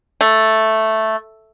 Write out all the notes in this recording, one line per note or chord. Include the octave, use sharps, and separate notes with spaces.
A3